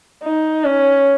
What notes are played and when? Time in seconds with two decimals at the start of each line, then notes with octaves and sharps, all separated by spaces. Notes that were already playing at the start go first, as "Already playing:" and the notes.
0.23 D#4
0.64 C#4